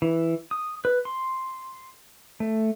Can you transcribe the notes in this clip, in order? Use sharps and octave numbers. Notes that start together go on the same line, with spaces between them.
E3
D#6
B4
C6
A3